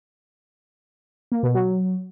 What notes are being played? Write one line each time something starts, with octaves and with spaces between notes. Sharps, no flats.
A#3
B2
F#3